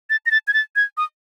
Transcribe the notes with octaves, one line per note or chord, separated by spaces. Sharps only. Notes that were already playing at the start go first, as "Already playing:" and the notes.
A6
A#6
A6
G#6
A6
G#6
D#6